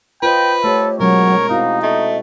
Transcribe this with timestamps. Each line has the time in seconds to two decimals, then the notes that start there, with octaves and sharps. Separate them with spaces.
0.23 F4 B4 C5 D#5 G5
0.64 A3 G4 A4 C#5
1.00 B2 F#3 G#3 C#4 A#4 C#5
1.49 C4 D#4 E4 F#4 F5
1.83 A3 D#5